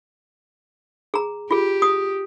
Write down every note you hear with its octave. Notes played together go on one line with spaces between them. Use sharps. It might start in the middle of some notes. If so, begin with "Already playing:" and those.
G#4 A#5
F4 G4 G#4
D#6